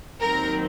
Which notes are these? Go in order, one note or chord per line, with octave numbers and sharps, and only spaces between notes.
D#2 D#3 F#3 C4 A#4